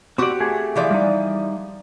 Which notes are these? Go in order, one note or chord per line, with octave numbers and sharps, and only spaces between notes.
C4 F#4 G4 D5
A3 G#4
E3 F3 D5
G3 D#4